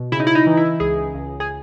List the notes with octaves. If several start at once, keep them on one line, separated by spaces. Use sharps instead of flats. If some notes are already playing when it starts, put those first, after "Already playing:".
Already playing: B2
C#3 E4
D#4
E4
D#4
E3
E4
C#2 G#4
C#2
G#4